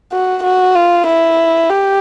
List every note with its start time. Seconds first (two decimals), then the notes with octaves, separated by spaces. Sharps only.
0.12 F#4
0.43 F#4
0.75 F4
1.06 E4
1.70 G4